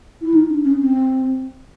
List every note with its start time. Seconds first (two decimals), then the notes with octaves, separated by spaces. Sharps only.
0.22 E4
0.34 D#4
0.49 D4
0.65 C#4
0.80 C4